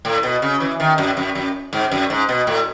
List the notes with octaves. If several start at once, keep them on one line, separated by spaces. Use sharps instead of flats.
A2
B2
C#3
E3
D#3
F#2
F#2
F#2
G#2
F#2
G#2
B2
A2